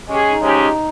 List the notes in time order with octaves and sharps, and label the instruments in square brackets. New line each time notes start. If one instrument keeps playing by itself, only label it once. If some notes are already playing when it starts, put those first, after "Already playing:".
[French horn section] G#3 C#4 G#4 [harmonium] G4
[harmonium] D#4
[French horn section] C#3 F3 G#3 C#4 G4